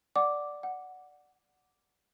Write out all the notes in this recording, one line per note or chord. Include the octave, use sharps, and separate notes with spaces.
D5 F#5 D6
F#5